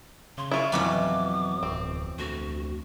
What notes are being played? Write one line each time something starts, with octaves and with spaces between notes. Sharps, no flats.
C#3 C6
E4 F4 C#6
F2 B2 E3 F#3 D6
D1 C4
D2 F#4